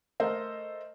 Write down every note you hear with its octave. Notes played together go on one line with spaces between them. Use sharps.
A3 A4 A#4 C5 D#5